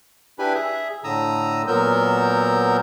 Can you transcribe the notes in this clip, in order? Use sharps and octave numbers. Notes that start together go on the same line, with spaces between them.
D4 E4 G4 B4 G#5 B5
G#4 E5
A2 D3 A#5 D#6 E6
A#2 F#3 B3 A#4 E6 G6